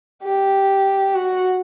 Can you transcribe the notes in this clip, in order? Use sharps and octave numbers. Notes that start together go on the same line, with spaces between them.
G4
F#4